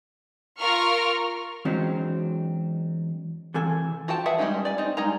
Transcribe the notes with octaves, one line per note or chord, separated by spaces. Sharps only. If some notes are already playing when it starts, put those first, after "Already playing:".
F4 A#4 C#6 F6
E2 F#3 G#3 C4 C#4 D#4
C3 E3 A4 G#5
F3 F#4 A4 G5 A5
G#4 B4 E5 F#5
G3 G#3 C4 C#4 D#4
D5 G#5
C4 D#4
G3 G#3 D#4 G#5 A#5